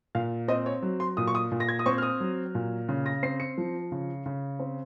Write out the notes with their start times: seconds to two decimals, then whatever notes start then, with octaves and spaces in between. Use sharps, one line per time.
0.15 A#2 F5
0.48 C4 D#5
0.66 C#5
0.82 F#3
1.00 C6
1.17 A#2 D#6
1.28 C#6
1.35 D#6
1.52 A#2
1.60 A#6
1.69 G#6
1.79 D#6
1.86 C4 C#6
1.98 F6
2.02 D#6
2.20 F#3
2.55 A#2
2.89 C#3
3.06 A#6
3.23 C4 C7
3.40 C#7
3.58 F3
3.92 C#3
4.26 C#3
4.59 C4